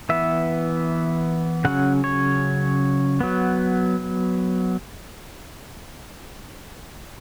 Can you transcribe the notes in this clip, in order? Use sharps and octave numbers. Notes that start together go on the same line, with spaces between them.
E3 B3 E5
C#3 F#3 C#4 F#5
C#5
F#3 B3